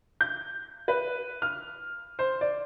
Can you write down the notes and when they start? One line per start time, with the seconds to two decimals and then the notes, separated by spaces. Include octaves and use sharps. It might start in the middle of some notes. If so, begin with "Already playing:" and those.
0.21 G6
0.88 B4
1.42 F6
2.19 C5
2.41 D5